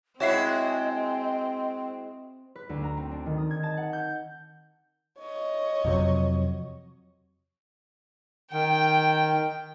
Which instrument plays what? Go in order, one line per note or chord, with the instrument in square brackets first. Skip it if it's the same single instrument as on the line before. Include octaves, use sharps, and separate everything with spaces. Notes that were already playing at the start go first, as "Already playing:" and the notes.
[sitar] G#3 E4 F#4 [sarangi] C4 [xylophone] C#5 E5 C7 [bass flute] D#5
[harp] B4
D2
A#5
C4
D4
D#3
D#6
G#6
A5
F#5
G6
[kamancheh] C#5 D#5
[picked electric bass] F2 C3 F#3
[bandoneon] D#3 [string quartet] G5